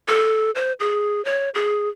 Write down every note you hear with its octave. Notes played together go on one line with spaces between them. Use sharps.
A4
C5
G#4
C#5
G#4